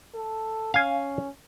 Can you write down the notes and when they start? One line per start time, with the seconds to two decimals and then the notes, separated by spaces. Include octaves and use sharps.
0.15 A4
0.74 C#4 F5 G#5